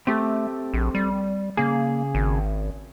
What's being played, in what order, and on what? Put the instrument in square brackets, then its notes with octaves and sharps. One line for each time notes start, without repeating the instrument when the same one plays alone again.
[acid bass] A3 [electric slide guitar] C4 G4 A4
[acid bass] A#1
G3
[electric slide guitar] C#3 G#4 [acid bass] A#3
[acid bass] G#1